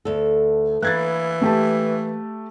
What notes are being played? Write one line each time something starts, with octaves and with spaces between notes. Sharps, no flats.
D2 A4
E3 A#3 B4 F#6 G#6 A6
A3 G4 A5